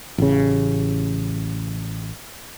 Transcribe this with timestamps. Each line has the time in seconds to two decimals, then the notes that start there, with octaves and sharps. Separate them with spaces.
0.18 A1 C#3